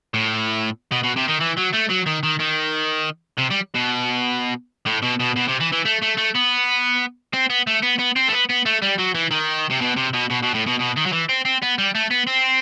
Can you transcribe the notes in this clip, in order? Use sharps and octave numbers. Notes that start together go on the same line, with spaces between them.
A2
B2
B2
C3
D#3
E3
F#3
A3
F#3
D#3
D#3
D#3
C3
G3
B2
A2
B2
B2
B2
C3
E3
E3
A3
A3
A3
B3
C4
B3
A3
B3
B3
C4
A3
B3
B3
A3
G3
F#3
E3
D#3
C3
B2
C3
B2
B2
B2
A2
B2
B2
D#3
F#3
E3
C4
C4
B3
G3
A3
B3
C4